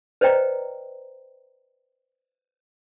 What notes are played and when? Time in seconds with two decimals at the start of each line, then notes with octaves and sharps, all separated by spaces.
0.21 B4 C5 D5 D#5 G5 A#5